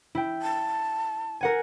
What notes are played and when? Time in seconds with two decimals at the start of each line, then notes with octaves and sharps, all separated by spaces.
0.15 E4 G5
0.42 A5
1.41 A#4 F#5 G#5